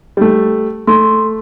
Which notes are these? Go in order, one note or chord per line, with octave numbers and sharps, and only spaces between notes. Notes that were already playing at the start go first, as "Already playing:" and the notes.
G3 A3
A3 C6